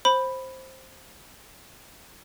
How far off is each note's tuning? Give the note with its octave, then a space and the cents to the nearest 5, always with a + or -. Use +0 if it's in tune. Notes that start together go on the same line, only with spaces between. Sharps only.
C5 +10 B5 +5